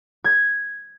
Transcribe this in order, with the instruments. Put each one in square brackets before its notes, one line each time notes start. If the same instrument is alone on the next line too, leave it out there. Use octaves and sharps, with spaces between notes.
[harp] G#6